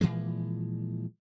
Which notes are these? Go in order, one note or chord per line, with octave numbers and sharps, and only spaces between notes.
A#2 E3 F3 G#3